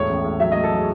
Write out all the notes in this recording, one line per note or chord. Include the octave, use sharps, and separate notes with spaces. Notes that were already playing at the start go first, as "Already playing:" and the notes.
Already playing: E1 A2 C#5
A1
A2
F#3 E5
D#5
A3
A4
F#3 G#4